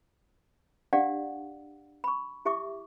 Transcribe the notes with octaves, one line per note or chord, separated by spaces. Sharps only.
D4 G4 D5 F5 F#5
B5 C#6
E4 G4 E5 C#6 D6